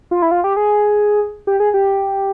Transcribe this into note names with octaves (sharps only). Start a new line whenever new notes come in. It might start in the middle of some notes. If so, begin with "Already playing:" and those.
F4
E4
F4
G4
G#4
G4
G#4
G4